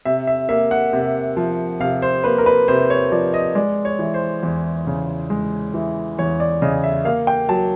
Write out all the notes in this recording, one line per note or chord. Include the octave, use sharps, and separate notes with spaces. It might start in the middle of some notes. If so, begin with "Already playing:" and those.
C3 E5
E5
A#3 E5
F#5
C3
F3
C3 F5
C5
A#3 B4
A#4
B4
C3 C5
C#5
F3 D5
D#5
G#3 D5
C#5
E3
C5
E2
C#3
G#3
E3
E2 C#5
D5
C#3 D#5
E5
A#3 F5
G5
F#3 A5